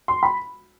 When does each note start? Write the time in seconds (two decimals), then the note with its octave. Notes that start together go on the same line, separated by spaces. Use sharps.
0.08 C6
0.23 B5